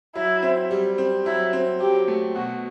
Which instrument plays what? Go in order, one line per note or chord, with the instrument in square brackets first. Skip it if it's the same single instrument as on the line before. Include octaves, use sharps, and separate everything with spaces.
[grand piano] F#3 [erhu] E4
[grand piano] C4
G3
C4
[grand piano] F#3 [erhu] E4
[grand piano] C4
[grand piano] F#3 [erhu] G4
[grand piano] A3
[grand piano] B2 [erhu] F#4